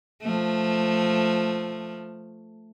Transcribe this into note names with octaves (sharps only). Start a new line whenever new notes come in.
F3 A3